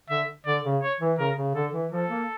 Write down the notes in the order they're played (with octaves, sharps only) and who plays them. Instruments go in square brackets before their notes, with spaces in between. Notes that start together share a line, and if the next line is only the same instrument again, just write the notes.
[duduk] D3 [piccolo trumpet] E5
[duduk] D3 [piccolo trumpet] D5
[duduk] C#3
[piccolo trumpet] C#5
[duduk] E3
[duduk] C#3 [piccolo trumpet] A#4
[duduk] C#3
[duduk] D3 [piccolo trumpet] A4
[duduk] E3
[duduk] F3 [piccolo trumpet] A4
[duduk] A#3